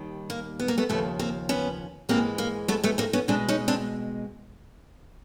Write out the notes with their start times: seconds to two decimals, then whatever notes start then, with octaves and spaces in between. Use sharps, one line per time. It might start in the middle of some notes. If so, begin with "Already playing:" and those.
Already playing: D#2 D#3 G3
0.30 A#3
0.59 B3
0.68 A#3
0.78 A3 B3
0.89 D#2 C#3 F3 A3 B3
1.19 A#3 C4
1.49 B3 C#4
2.09 G#2 E3 G#3 A#3 C4
2.38 A#3
2.68 A3 B3
2.84 A3 B3
2.98 A#3 C4
3.13 B3 C#4
3.28 B2 G#3 C4 D4
3.49 C#4 D#4
3.68 C4 D4